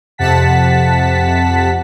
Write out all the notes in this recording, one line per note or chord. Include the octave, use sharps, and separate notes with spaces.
F2 C3 F#5 A5 B6